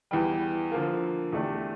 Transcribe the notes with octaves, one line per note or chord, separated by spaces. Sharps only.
E2 E3 G3
D3 F3 A#3
E2 D3 A3 D4 G4